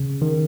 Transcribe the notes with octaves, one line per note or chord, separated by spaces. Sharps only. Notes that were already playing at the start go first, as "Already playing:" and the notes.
Already playing: C#3
D#3